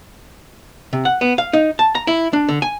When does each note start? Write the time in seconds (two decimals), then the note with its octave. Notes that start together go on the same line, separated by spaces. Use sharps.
0.93 C3
1.05 F#5
1.21 B3
1.38 F5
1.53 D#4
1.79 A5
1.95 A#5
2.07 E4
2.33 D4
2.49 D3
2.62 G#5